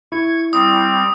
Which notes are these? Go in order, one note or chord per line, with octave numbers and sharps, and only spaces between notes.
E4 C#6 G#6
G3 C4 D#6